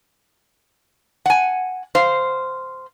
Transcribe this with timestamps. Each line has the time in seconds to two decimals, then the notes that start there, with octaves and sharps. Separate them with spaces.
1.26 F#5 G#5
1.95 C5 F5